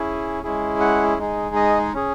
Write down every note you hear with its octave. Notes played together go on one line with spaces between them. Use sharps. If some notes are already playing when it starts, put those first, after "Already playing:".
Already playing: C#4 E4 G#4
G#3 C#4 E4 G#4
F#5
G#3 D#4 G#4
D#5
C#4 G#4